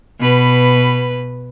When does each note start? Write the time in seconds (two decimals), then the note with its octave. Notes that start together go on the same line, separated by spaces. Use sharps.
0.20 B2 B4